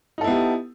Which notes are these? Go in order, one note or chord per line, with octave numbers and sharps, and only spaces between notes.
B3 D#4 E4 G4 A4